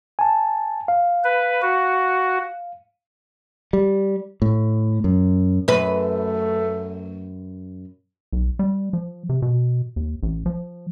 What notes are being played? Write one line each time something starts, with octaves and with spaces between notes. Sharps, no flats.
G#5 A5
F5
B4
F#4
G3
A2
F#2
F#2 A3 B4
B1
G3
F3
C3
B2
D#2
A1
F3